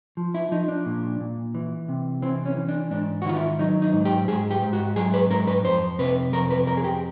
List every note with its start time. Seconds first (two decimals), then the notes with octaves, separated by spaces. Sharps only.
0.17 F3
0.34 E4
0.52 F3 D#4
0.68 D4
0.86 A#2
1.20 A#2
1.55 E3
1.88 C3
2.22 E3 C4
2.46 C#4
2.57 E3
2.68 D4
2.91 G#2 D4
3.22 F#4
3.26 D#3 F4
3.37 E4
3.59 F#3 D#4
3.82 D#4
3.93 G#2
4.05 G4
4.28 G#2 G#4
4.51 G4
4.62 G#2
4.73 F#4
4.96 F#3 G#4
5.14 B4
5.30 G#2 A#4
5.47 B4
5.64 F2 C5
5.99 C3 B4
6.32 F2 A#4
6.50 B4
6.67 F2 A#4
6.77 G#4
6.84 G4